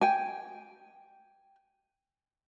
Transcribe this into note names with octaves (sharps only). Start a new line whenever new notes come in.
G5 G#5